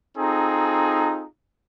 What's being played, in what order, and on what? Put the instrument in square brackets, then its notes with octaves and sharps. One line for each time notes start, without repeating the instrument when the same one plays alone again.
[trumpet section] C4 D#4 F4 G#4 A4 A#5